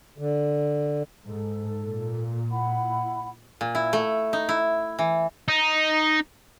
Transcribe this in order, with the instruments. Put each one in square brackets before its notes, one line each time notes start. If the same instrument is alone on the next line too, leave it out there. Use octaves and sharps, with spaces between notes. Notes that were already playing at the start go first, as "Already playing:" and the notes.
[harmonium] D3
[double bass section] G#2 [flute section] A4
[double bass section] A#2
[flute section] E4 F#5 B5
[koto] A#2
E4
A3
D#4
E4
E3
[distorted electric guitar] D#4